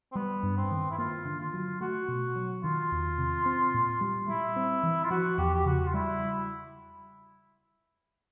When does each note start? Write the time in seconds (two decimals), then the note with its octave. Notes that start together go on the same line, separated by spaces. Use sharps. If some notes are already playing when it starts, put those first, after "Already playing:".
0.12 C4
0.15 G3 B3
0.43 G2
0.57 C4
0.71 D#3
0.91 E4
0.98 A#3 F4
1.25 D3
1.40 F4
1.54 F#3
1.81 A3 F#4
2.08 B2
2.36 F#3
2.63 D#3 F4
2.92 E2
3.18 C3
3.46 C4
3.74 A#2
4.01 G3
4.28 G3 E4
4.56 C4
4.83 E3
5.04 F4
5.10 F3 F#4
5.38 E2 G4
5.54 G4
5.65 C#3 F#4
5.87 F4
5.94 G3 E4